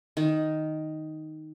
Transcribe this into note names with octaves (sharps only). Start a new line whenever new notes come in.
D#3